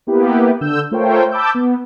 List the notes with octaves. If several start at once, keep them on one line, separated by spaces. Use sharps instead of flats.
A#3 B3 E4 G4 B4
D3 E6 G6
A3 F4 A#4 C5 C#5 G5
A5 B5 D6 E6 G6
B3